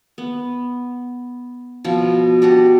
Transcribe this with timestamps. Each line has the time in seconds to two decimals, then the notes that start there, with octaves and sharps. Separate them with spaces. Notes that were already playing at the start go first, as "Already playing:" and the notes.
0.18 B3
1.84 B2 F3
2.42 D4 F#4 G4